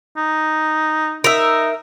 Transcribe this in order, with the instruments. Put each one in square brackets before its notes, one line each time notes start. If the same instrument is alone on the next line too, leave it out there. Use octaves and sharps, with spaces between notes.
[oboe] D#4
[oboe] D#4 [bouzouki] A#4 E5